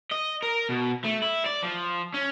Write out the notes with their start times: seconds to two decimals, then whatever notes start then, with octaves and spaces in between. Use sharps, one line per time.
0.12 D#5
0.43 A#4
0.69 B2
1.05 A3
1.22 E4
1.46 D5
1.63 F3
2.14 C#4